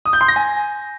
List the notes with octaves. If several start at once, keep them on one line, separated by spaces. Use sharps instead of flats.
D#6
G6
C6
A#6
G#5